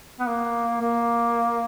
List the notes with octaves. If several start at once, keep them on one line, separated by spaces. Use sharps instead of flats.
B3
A#3
A#3